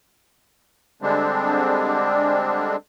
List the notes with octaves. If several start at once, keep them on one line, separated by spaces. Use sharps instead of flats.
D3 G3 G#3 C4 D4